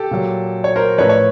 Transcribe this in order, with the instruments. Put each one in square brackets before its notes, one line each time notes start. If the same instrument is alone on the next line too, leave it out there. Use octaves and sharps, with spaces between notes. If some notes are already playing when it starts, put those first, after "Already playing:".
Already playing: [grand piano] G4 A4
A#2 F#3
C#5
A#4 C5
A2 F3 B4 C#5
C#5